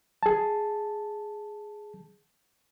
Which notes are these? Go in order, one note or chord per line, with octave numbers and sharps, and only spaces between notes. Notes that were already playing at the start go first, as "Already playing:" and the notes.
G#4 A5